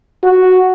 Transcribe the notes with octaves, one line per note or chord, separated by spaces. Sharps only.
F#4